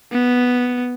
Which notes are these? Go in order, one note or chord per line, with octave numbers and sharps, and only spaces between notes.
B3